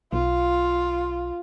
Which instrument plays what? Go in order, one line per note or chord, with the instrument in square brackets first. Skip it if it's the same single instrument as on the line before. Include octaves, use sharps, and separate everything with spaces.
[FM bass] B1 [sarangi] F4